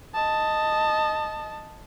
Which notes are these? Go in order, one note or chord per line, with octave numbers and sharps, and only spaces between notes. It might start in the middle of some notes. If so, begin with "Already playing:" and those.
D#5 A5